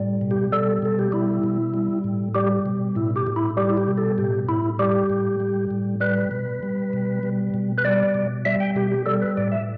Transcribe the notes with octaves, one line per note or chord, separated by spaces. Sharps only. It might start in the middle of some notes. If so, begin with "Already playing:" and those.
Already playing: A2 G3
B2
G4
G3 A4
B2 A4
G4
G3 E4
B2
G3
A2
G3 G4
B2
A2 E4
G4
A2
E4
G3 G4
E4
G4
B2
A4
A2 G4
A2 E4
G3 G4
A2
G3
A2
G3 B4
B2
G3
B2
G3
B2
B4
G3 D5
B2
G3 E5
G5
B2 G4
G4
G3 A4
B4
A2 D5
E5